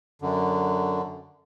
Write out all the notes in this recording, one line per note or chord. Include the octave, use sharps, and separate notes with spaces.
F#2 D3